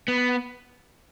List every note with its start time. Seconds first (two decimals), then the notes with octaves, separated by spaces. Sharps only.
0.08 B3